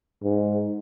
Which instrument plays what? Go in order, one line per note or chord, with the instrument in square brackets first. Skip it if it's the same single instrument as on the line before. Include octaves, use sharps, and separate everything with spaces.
[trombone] G#2